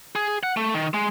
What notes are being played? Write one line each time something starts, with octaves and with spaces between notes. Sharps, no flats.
G#4
F#5
A3
D#3
G#3